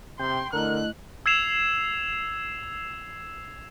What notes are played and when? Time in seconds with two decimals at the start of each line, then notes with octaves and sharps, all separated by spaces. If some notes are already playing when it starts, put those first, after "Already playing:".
0.19 C3 G5 C6
0.53 D3 A3 E4 A#4 D#5 F#6
1.26 E6 G#6 C7 E7 F7